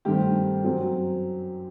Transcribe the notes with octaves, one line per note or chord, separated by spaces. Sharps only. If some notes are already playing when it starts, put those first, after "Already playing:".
G2 D#3 A3 C4 G4
F#2 F#3 C4